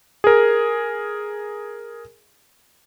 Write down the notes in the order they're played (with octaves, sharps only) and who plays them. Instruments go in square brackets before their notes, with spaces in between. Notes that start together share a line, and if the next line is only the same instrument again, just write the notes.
[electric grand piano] G#4 A#4